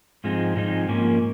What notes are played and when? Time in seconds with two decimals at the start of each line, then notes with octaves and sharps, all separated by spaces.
0.24 G#2 F3 G#3 C4 D#4
0.56 G#2 F3 G#3 C4 D#4
0.89 G#2 F3 A#3 C#4